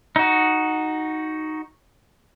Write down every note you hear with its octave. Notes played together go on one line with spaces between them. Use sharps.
D#4 F#4